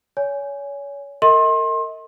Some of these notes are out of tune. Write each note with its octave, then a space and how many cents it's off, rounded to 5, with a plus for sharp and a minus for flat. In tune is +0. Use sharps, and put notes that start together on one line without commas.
C#5 +30 G#5 +0
A#4 -35 D#5 +40 C6 +30